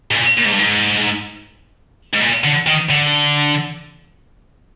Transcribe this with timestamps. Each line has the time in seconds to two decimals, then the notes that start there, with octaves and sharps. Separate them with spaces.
0.11 G#2
0.15 A#2
0.38 A#2
0.45 G#2
0.51 G2
0.58 G#2
2.14 G#2
2.21 A#2
2.44 D3
2.67 D#3
2.90 D3